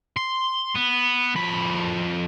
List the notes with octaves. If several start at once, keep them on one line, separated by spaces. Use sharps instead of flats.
C6
B3
F2 B5